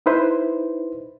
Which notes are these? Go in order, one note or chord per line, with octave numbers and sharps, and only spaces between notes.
D#4 E4 B4 C5